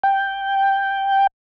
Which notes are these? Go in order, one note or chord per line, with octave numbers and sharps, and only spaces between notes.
G5